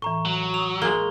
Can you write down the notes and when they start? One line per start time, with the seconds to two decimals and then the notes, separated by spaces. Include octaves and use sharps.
0.02 A2 E3 A#5 C#6
0.25 F#3
0.54 A#5 D#6 F7
0.82 G#3 A#3 G7